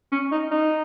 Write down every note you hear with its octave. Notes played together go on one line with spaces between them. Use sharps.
C#4
D#4
D#4